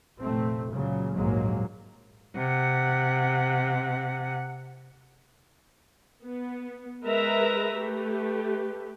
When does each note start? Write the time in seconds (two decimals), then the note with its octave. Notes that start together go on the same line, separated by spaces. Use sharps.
0.20 F1 A#2 A3 C4
0.70 C#2 A#2 C#3 F#3
1.14 A#1 D#2 G#2 F#3 G#3 A#3
2.36 C3 F#5
6.22 B3
7.02 G#3 A#4 B4 E5 A#5
7.77 A3 G4 B4